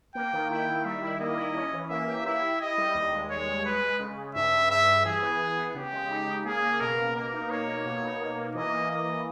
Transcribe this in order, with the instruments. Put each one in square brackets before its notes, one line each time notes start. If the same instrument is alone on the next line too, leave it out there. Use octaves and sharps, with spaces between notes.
[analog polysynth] A#3 [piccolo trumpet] G5
[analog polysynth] D#3
[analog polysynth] E4 [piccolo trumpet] G5
[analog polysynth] D#3
[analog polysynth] G3 [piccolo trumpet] E5
[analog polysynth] E4
[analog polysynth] A#3 [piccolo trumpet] D#5
[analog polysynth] E4
C#4
E3
[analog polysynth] A#3 [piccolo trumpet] E5
[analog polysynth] G4
[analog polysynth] E4 [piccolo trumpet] E5
[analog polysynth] E4
[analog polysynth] E4 [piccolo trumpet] D#5
[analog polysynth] G3
D#2
G#3
[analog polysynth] G#3 [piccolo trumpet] C#5
[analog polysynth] D#2
[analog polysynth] G#3 [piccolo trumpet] B4
[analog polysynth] G#3
C#3
C#3
[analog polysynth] G2 [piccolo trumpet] E5
[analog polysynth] G2
[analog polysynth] G2 [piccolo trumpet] E5
[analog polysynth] G2
[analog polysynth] E3 [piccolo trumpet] G#4
[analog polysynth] B3
B3
B3
[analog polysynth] C#3 [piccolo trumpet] G4
[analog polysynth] G#3
D#4
C#3
[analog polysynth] A#3 [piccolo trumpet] G#4
[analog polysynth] A#3
[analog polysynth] B2 [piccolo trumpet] A#4
[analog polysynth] B2
[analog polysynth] A#3 [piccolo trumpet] A#4
[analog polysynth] D#4
[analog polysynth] A#3 [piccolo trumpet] C#5
[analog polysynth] A#3
B2
D#4
A#3
A#3
[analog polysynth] E3 [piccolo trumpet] D#5
[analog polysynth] A#3
[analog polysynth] A#3 [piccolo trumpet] D#5
[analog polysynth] E3